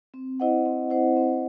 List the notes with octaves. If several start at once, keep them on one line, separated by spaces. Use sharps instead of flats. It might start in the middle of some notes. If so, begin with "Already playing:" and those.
C4
E4 C5 D#5 F#5
C4
E4 C5 D#5 F#5
C4